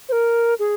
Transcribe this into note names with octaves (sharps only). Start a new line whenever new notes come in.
C5
A#4
G#4